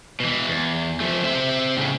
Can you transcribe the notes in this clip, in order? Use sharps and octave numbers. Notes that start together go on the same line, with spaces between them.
B2 E3
E2
F3 A3
C4 E5
A2 C#3